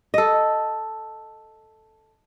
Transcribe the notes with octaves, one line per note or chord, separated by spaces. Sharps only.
A4 D#5